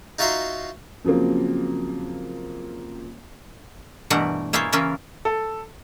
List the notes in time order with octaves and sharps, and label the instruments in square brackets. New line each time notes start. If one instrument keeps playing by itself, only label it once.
[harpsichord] D#4 F4 F#4 E5 A#5 C6
[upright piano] C#3 F3 F#3 A#3 C4
[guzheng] G2 B2 E3 A3 A#4 F#5
A#3 E4 F4 G#4 C5 C#5
C#3 E3 C#4 E4 F4 A#4
[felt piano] A4